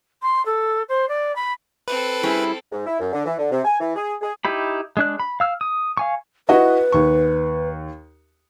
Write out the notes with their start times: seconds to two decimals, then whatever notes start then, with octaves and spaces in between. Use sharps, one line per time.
0.22 C6
0.45 A4
0.88 C5
1.08 D5
1.35 B5
1.88 C4 A4 B4
2.23 G3 C#4 E4 G#4
2.72 G#2
2.86 E4
3.00 F#2
3.13 D3
3.26 E3
3.38 D3
3.52 C3
3.65 G#5
3.80 E3
3.96 G#4
4.22 G#4
4.45 D#4 E4 G4 B5
4.97 G#3 D4 F#6
5.20 B5
5.40 F5 E6 F6
5.61 D#6
5.97 F5 G#5 C#6
6.49 E4 F#4 B4 D#5
6.92 D#2 C#6